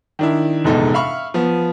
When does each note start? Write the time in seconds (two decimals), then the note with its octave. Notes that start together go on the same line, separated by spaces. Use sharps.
0.19 D#3 D4 E4
0.64 F1 A#1 E2 G#2 D#4 A4
0.93 E5 F5 B5 C#6 F6
1.34 F3 B3